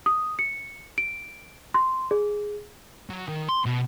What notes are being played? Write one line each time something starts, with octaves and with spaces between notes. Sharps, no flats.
D#6
C#7
D7
C6
G#4
F#3
D#3
C6
B2